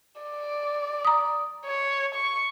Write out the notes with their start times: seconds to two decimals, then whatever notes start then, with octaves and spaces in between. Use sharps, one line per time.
0.21 D5
1.05 A#5 D#6
1.65 C#5
2.15 C#6